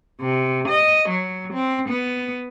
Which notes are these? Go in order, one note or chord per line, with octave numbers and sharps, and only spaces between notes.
C3
D#5
F#3
C4
B3